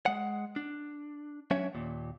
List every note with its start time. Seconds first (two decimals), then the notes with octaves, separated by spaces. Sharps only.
0.06 G#3 F#5
0.56 D4
1.51 F#3 C#4 D4 C#5 E5
1.75 D#2 A#2